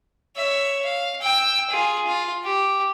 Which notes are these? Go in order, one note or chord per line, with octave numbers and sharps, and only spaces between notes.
C#5 E5
F5
G5 E6
F4 G#4
F4
G4